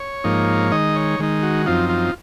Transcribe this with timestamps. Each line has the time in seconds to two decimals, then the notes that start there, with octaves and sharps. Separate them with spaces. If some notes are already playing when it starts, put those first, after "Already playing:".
Already playing: C#5
0.24 G#2 F3 A#3 D#4
0.72 D#3 G#3 D#4 D#5
0.96 C#5
1.19 D#3 G#3 D#4
1.43 F#4
1.66 F#2 F3 C4 D#4 F4
1.89 F4